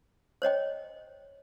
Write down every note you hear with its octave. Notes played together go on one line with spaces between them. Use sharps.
C5 C#5 D#5 G5